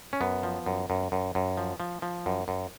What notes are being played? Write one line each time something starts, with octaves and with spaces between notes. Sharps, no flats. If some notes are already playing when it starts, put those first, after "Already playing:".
C#4
F#2 B3
F3
F#2
F#2
F#2
F#2
F3
F3
F3
F#2
F#2